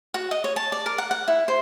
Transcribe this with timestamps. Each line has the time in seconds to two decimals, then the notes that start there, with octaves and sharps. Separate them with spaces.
0.14 F#4
0.31 D#5
0.44 C#5
0.56 A5
0.72 D5
0.86 A#4
0.98 F#5
1.11 F#5
1.28 E4
1.48 C5